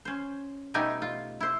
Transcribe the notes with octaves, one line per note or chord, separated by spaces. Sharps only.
C#4 C5
B2 G3 A3 D#4 G4 G#5
F4
E4 C5